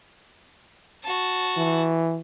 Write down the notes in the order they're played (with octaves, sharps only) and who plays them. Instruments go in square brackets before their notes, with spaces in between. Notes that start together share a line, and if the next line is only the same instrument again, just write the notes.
[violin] F#4 A5
[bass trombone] E3